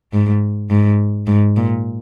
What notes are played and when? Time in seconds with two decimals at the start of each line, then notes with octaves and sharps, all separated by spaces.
0.13 G#2
0.70 G#2
1.27 G#2
1.57 A#2